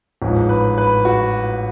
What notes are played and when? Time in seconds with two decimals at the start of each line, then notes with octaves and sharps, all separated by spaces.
0.22 A1 G#2 F3
0.49 B4
0.78 B4
1.05 F#4